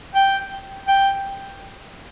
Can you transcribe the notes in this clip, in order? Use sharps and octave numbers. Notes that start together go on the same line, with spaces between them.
G5
G5